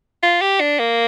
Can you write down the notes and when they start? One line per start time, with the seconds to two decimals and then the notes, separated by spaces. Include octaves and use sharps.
0.23 F4
0.41 G4
0.60 D4
0.79 A#3